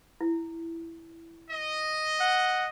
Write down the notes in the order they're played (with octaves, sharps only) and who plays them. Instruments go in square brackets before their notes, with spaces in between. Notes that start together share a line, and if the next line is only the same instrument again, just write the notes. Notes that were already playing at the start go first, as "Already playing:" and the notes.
[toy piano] E4
[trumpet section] D#5
[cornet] F#5